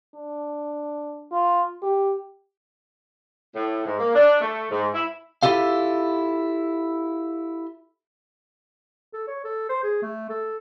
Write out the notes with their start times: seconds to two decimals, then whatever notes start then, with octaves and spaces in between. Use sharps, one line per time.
0.14 D4
1.31 F4
1.83 G4
3.56 A2
3.85 G#2
3.98 A#3
4.14 D4
4.41 A3
4.71 G#2
4.93 E4
5.43 E4 F4 G4 A4 F5
9.13 A4
9.27 C#5
9.44 A4
9.69 C5
9.83 G#4
10.02 A3
10.29 A4